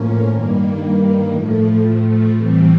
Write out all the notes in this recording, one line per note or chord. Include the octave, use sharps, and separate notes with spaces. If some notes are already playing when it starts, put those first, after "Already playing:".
Already playing: A2 F3 A#3 C#4
G2 D#3 G3 A#3
A2 F3 A3
A2 E3 G3 C4